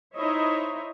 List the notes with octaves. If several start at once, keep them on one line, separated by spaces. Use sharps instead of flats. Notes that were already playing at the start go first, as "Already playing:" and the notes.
D#4 E4 C5 C#5 D#5 E5